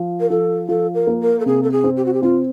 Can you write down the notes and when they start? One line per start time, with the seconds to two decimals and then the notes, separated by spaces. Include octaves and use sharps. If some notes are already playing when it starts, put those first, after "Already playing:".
Already playing: F3
0.20 A#4
0.30 F3 A4
0.69 F3 A4
0.94 A#4
1.07 A#3
1.21 A#4
1.40 A4
1.46 C3 G#4
1.63 A4
1.71 G#4
1.84 C4
1.97 G4
2.06 F#4
2.14 G4
2.23 C4 F4